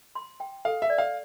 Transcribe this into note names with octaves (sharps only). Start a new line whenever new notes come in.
C6
G5
A4 F5
E5
D5
F5